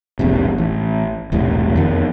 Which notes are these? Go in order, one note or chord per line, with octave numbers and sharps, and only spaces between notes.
E1 A#1 G#2 C3
A1
E1 C2 A2 C3
F2 D#3